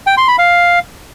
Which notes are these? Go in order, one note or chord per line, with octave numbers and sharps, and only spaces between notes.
G5
C6
B5
F5